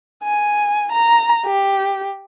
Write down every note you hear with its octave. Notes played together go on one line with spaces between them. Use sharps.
G#5
A#5
G4